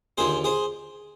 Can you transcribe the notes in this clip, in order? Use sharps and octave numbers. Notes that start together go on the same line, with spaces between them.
D#2 D3 F3 G#4 C5
G#4 C5